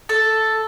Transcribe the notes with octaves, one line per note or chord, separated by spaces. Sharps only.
A4